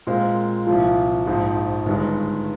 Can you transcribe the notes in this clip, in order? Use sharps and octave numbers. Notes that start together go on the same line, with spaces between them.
A#2 G#3 C4 F4 A#4
C2 A#2 F3
A#1 G#2 F3
G1 G2 D#3 G#3